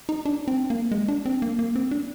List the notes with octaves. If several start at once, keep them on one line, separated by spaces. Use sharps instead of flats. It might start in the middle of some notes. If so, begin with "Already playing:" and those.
D#4
D4
C4
A#3
G#3
D4
C4
A#3
A#3
C4
D4